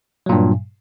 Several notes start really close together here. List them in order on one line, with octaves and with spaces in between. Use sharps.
F#3 A#2 G2